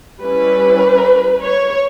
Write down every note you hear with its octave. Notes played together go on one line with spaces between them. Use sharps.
G3 C#4 E4 B4
C#5